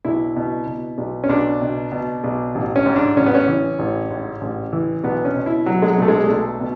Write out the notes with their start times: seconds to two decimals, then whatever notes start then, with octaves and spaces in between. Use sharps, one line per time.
0.05 B1 E4
0.36 B2
0.67 B2
0.98 B1
1.24 C#4
1.29 B1 D4
1.61 B2
1.92 B2
2.24 B1
2.55 A1
2.76 C#4
2.86 G#2
2.96 D4
3.16 A1 C#4
3.26 B3
3.35 C#4
3.48 E3
3.79 A1
4.10 G#2
4.41 A1
4.73 E3
5.04 B1 B3
5.25 C#4
5.36 B2
5.46 E4
5.66 B2 F#3
5.82 G#3
5.87 F#3
5.98 B1 A3
6.08 G#3
6.24 G#3
6.29 B1 A3
6.60 B2